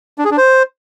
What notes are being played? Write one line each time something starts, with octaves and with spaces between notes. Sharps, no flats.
D4
G#4
D4
C5